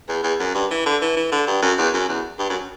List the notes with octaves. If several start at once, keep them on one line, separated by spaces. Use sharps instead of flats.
E2
E2
F#2
G2
E3
D3
E3
E3
D3
G2
F#2
E2
F#2
E2
G2
F#2